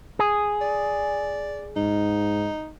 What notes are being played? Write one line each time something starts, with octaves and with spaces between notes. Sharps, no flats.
G#4
D5
G#2 D#4